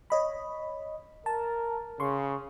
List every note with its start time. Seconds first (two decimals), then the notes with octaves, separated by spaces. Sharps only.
0.10 C#5 D#5 B5
1.26 A#4 A5
2.00 C#3 C6 C#6